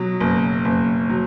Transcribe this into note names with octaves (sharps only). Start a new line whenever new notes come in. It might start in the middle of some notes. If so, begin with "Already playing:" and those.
Already playing: B2 F#3
F#1
F#1
F#3